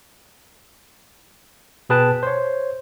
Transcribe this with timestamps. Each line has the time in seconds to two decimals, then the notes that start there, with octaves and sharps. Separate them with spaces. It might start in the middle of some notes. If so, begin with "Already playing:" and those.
1.89 B2 G#4 B4 G5 A5 F#6
2.23 C5 C#5